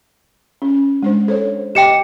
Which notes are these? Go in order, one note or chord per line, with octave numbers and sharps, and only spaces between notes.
C#4
G#3 D4 C5
A4 C5 C#5
G4 D#5 G5 D6 C#7 E7